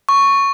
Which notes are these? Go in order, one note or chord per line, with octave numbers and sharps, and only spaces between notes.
C#6